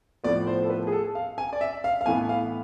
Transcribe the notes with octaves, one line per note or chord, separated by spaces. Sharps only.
A2 F3 B3 D5
C5
A4
B4
G#4
A4
F5
G#5
D5
E5
F5
F5
A2 E3 B3 G#5
F5